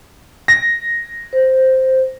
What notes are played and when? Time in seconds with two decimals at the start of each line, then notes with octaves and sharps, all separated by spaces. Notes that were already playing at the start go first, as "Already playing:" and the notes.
0.48 A#6
1.33 C5